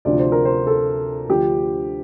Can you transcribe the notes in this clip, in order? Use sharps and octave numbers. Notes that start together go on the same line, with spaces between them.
D2 C3 F3 D5
C5
A#4
C5
A4
D2 D3 F3 G4